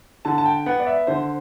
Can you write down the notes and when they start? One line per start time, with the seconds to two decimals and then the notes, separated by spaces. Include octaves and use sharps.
0.25 D3 A5
0.38 A5
0.46 G5
0.66 B3 F#5
0.80 D5
0.86 E5
1.07 D3 C5